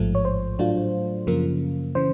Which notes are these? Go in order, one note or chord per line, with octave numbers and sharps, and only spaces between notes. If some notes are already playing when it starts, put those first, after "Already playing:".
Already playing: A1 G#2 F3 A3
C#5
C5
A2 F#3 A3 D4 F4
F#2 C#3 F3 A#3
C#3 E3 C5